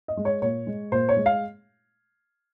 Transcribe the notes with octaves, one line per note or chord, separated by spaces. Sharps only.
D#5
G#3
C#5
A#2 C#5
G#3
A#2 C5
C#5
G#3
F5